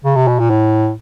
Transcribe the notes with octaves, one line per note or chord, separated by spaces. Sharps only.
C#3
C3
B2
A#2
A2